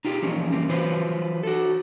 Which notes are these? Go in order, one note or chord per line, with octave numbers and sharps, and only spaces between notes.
D#4 F4 G4 G#4
E3 F3 A#3 C#4
E3 A#3 C4
E3 F#3 F4 B4 C5
F#4 A4